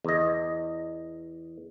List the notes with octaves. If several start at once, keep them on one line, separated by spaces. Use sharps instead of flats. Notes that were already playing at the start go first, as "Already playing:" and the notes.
E2 D#5